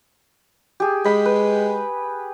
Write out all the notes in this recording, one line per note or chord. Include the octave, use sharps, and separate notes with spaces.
G4 G#4
G#3 B5
B4